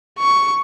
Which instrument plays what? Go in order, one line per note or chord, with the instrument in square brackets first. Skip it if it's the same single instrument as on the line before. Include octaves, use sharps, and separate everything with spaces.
[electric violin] C#6